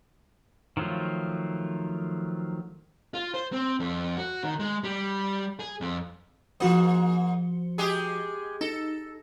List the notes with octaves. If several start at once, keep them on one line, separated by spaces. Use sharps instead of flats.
D#3 F3 F#3 A3 F4
F4
C5
C4
F2
F#4
D#3
G#3
G3
G#4
F2
G#2 F3 A#3 F#4 C5
G#3 G4 G#4
D#4 A4